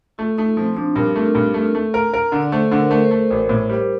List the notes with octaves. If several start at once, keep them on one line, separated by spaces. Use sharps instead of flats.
A3 F4
A3 D#4
F3 C4
F3 D4
G2 A#4
A3
G2
A3
A3
A#4
A#4
D3
D5
A3 C5
D3
A#4
A3
C5
A3
A1
A2
G3